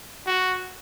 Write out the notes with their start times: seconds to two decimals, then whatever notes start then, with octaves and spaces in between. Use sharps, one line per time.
0.26 F#4